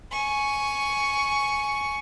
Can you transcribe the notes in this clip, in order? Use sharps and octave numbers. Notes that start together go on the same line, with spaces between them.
G#5 C#6